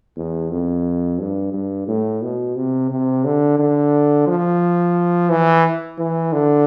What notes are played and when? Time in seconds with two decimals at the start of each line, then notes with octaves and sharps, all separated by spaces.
0.16 E2
0.51 F2
1.19 G2
1.53 G2
1.88 A2
2.22 B2
2.56 C3
2.90 C3
3.25 D3
3.59 D3
4.27 F3
5.30 E3
5.98 E3
6.33 D3